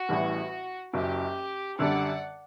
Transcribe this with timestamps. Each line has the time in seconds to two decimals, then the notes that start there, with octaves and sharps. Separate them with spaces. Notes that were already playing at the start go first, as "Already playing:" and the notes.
Already playing: F#4
0.09 A1 A2 E3 G3
0.93 F#1 F#2 F#3 G4
1.79 F#2 D3 G3 D5 F#5